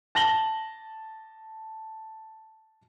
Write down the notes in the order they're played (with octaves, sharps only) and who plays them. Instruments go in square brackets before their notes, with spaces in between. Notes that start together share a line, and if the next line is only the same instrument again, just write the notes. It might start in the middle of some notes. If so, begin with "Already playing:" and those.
[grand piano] A5 A#6 F#7 G7